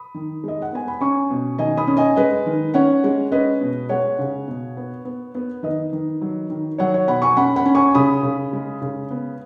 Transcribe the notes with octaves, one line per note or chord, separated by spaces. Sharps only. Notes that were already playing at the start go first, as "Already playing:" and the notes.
Already playing: B5 D#6
D#3
G#3 D#5
F#5
B3 G#5
B5
C#4 G#5 C#6
B2
D#3 D#5 G#5
B5 D#6
C#4
D#5 G#5
G#3 B4 D#5
D#3
C#4 C#5 F#5
G#3
C#4 B4 D#5
B2
G#3 C#5 F#5
C#3
B2
B3
B3
B3
D#3 B4 D#5
D#3
F#3
D#3
F#3 C#5 F#5
C#5
B2 F#5 B5
G#5 C#6
C#4 F#5 B5
F#5 B5
C#4
G#5 C#6
C#3 B5 D#6
C#3
G#3
C#3
B3